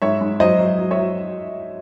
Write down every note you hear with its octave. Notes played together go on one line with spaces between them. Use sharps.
G#2 C#5 E5
G#2
F#3 C5 D#5
F#3
F#3
C#5 E5
F#3